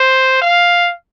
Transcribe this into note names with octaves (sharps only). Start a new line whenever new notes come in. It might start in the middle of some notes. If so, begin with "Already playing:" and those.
Already playing: C5
F5